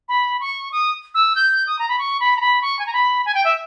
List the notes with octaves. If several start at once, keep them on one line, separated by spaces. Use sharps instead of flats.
B5
C#6
D#6
E6
G6
D#6
A#5
B5
C#6
B5
A#5
B5
C#6
G#5
A#5
B5
G#5
G5
E5